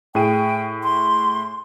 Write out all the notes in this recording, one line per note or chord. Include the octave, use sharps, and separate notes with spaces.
A2 G#4 G5 D#7
C6